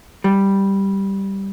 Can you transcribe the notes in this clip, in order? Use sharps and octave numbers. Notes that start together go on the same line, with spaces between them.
G3